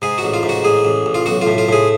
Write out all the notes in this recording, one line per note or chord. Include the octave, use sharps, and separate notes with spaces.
G#2 G#4
A1 F#4
F4
G#2
F#4
A1 G#4
A1
A1
F4
B1 F#4
F4
A2
F4
A2 G#4